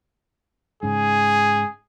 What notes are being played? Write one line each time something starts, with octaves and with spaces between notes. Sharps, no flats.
G#2 C#3 G#4